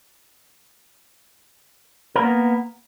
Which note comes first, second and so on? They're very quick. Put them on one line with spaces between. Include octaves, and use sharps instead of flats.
A#4 A#3 B3